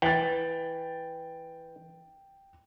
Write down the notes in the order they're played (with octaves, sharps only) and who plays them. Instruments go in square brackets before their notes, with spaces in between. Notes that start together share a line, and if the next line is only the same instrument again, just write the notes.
[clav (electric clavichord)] E3 [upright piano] G5 A6